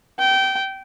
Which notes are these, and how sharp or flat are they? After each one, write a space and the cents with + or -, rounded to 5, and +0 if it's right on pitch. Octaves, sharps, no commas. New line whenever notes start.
G5 -20